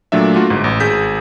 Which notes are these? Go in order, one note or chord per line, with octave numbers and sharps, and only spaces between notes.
A#2 F#3 A3 D4 E5
A3 A#3 D4 F4 F#4
G1 G#2
A1
G#1 G#4 G6 B6